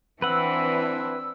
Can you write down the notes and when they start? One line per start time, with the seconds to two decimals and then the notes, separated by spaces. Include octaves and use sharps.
0.22 E3 C4 D4 E4 B4 F#5 E6